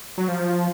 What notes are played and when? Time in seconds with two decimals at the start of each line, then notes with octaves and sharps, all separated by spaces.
0.18 F#3
0.28 F3